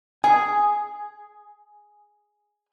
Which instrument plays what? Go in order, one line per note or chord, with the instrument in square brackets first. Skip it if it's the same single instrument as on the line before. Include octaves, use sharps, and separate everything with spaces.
[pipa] G#4 [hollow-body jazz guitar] G#5